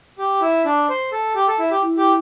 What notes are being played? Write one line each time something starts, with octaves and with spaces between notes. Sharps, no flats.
G4
E4
D4
C5
A4
G4
A4
E4
G4
E4
G4